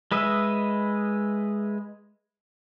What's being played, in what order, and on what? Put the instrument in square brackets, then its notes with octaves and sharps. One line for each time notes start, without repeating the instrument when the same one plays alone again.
[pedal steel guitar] G#3 B4 D#5 E5